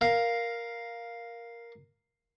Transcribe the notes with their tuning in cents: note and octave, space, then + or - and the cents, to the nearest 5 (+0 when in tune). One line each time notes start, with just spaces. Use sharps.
A#4 +5 F5 +0